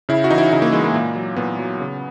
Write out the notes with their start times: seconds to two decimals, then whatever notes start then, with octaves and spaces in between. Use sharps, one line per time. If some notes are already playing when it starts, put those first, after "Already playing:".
0.09 C#3 E4
0.24 F#4
0.30 E3 D#4
0.38 E4
0.52 C#3 D#4
0.62 A#3
0.73 E3 G#3
0.84 A#3
0.94 A#2
1.15 F#3
1.36 A#2 B3
1.59 F#3
1.80 C#3